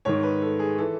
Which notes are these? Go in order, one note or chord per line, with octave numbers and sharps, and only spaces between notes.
G#2 D#3 C#5
B4
A4
G#4
E3 A4